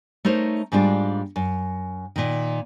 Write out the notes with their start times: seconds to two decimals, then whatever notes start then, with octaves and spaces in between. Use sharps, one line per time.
0.25 A3 D#4 A#4 C5 C#5
0.72 G#2 G3 A#3 D4 F4
1.36 F#2
2.16 A#2 D#3